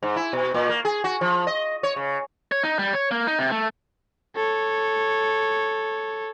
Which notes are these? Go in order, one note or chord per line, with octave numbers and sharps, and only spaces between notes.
G#2
E4
B2
A#2
A#3
G#4
F#4
F3
D#5
C#5
C#3
C#5
D#4
G3
C#5
A#3
D#4
C3
A3
A4 C#5